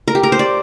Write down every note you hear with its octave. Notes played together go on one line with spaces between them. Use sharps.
A#4
G4
A#4
C5
D5